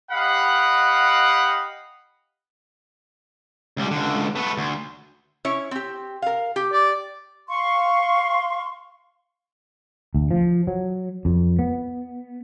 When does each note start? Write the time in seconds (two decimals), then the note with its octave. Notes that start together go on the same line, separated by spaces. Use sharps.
0.11 G4 D#5 F5 F#5 B5
3.77 C#2 G3
3.91 C#2 D3
4.35 A3 B3
4.58 D2
5.45 C#4 E4 C#5
5.71 C4 G4
6.22 A#4 F5
6.56 G4
6.73 D5
7.49 F5 C6 C#6
10.15 D2
10.31 F3
10.67 F#3
11.25 F2
11.59 B3